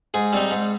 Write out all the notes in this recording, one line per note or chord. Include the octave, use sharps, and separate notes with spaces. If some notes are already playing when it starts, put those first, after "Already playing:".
G#2 G#4
G3 C4 D#4
G#2